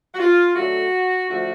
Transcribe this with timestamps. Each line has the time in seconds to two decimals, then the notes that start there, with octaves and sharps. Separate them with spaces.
0.14 F#4
0.19 F4
0.56 D3 F#3 A3 F#4
1.29 D3 F3 A3 F#4